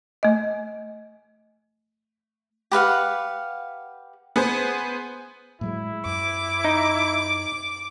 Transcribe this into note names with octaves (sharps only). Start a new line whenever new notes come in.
A3 D#5
G4 B4 F5 F#5
B3 G#4 C5
A2 F#3 G#3 E4
F#2 D6
D#4